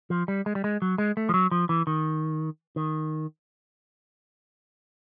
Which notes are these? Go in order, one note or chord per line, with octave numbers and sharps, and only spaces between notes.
F3
G3
G#3
G3
G#3
F#3
G#3
A3
F3
F#3
F3
E3
D#3
D#3